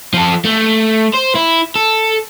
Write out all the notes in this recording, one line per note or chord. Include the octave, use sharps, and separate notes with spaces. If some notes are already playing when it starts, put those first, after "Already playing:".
F3 A4
A3
C5
E4
A4